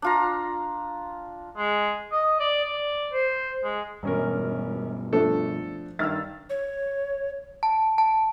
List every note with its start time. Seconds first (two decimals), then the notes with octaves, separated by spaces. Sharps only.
0.02 D4 F4 A#5
1.57 G#3
2.12 D#5
2.40 D5
2.65 D5
3.13 C5
3.64 G#3
4.03 E1 G2 B2 C#4 A#4
5.13 F3 A3 D4 A4
5.99 G2 D#3 E6 F6 A6
6.50 C#5
7.63 A5
7.98 A5